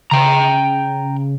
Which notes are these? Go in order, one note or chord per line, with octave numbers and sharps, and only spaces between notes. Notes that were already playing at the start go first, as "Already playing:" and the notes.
C#3 G5 A#5